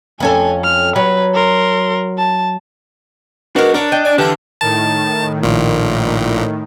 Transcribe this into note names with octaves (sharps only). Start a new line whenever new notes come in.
F2 C#4 A4 G#5
F6
F#3 B4
A#4 C6
A5
G#3 A#3 B3 D4 F#4 A#4
D4 A#4 C#5 D5
D#5 G5
D5 G#5
D3 E3 E4 G4 F5 A5
A2 D#3 A5
A#1 A#2